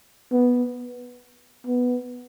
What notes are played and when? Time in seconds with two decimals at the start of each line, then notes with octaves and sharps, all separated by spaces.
0.32 B3
1.67 B3